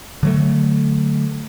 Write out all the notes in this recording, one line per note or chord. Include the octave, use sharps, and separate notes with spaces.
D3 F#3 A3